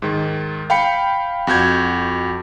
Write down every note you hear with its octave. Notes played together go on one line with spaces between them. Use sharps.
G#2 D#3
F5 G5 B5 C7 C#7
F2 F#4 G6 G#6